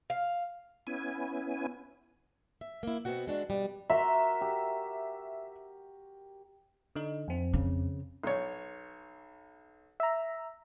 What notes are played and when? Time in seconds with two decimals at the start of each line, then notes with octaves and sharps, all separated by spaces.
0.10 F5
0.87 B3 C#4 E4 G#5
2.61 E5
2.83 A#3 E4
3.05 B2 B3 C4 F#4 F#5
3.26 E3 G#3 D4 F#4
3.50 B2 G3
3.90 F#4 A#4 E5 C6
4.41 G4
6.95 D3 D#4
7.28 F2 C4
7.53 C#3
8.23 B1 C#5
10.00 E5 A#5